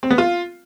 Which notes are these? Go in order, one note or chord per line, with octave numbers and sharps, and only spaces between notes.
C4
B3
F4